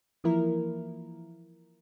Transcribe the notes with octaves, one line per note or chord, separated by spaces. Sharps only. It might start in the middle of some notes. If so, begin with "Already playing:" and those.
E3 F3 A#3 E4 A#4